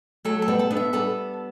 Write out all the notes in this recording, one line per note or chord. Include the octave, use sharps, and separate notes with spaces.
F#3 A3 A4
A4
G3 B3
A4
B3 D4
E5
G3 B3 A4